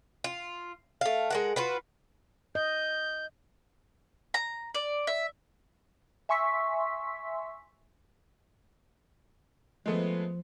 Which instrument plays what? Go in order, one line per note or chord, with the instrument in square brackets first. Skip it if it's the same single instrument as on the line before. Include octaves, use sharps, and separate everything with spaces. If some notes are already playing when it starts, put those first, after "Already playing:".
[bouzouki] F4
A3 F5
G#3 A#4 F#5
F4 F#4 B4
[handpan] D#5 [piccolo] G6
[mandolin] A#5
D5
E5
[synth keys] E5 G#5 C6 C#6 E6 B6
[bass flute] F3 [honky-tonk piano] G#3 A3 B3